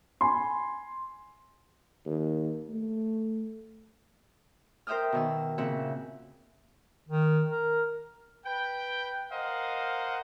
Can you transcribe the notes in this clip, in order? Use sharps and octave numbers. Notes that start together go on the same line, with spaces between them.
G#5 B5 C6
D#2
A3
A#4 C5 E5 G5 D#6 F6
B2 D#3 E6
A#2 C#3 C4 E5 F#5
D#3
A#4
B4 G5
A#4 C5 D#5 F5 F#5